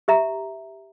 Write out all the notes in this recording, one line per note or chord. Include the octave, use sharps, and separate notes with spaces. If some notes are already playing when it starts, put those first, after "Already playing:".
G4 E5 A#5